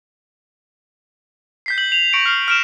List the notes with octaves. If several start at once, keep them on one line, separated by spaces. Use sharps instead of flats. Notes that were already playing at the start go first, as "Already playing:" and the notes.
G6 B6 C7
G6 B6 F#7
F7
C#6 A#6 C#7 D7
F6 C7 F7
F6 D7 E7